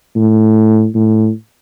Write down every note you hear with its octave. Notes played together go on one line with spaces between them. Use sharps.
A2
A2